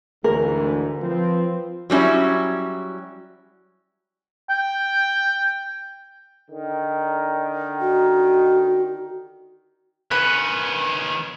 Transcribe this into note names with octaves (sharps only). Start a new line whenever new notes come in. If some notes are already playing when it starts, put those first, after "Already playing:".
D2 G#2 E3 A#4
F3 C4 B4
F#3 G3 C#4 E4
G5
D3 D#3
F#4
D#3 C#4 B4